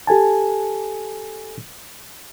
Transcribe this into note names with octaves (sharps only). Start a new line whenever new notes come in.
G4 A4 G#5 A5